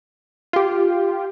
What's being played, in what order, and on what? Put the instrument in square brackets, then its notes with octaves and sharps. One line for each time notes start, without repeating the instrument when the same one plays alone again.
[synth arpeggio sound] F4 G4